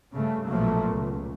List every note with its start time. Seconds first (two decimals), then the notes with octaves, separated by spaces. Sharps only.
0.14 G2 C#3 A3
0.47 A#1 B2 F3 F#3 A3 A#3
0.90 C#2